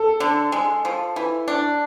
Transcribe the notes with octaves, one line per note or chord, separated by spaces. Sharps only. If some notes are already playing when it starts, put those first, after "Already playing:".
Already playing: A4
D3
G#3
F3
E3
D4